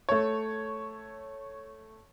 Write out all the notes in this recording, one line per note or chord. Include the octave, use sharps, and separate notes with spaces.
A3 C#5